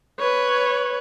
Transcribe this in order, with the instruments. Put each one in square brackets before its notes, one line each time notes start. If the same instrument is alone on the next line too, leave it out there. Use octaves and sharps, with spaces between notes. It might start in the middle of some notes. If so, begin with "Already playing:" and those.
[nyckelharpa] B4 [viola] C#5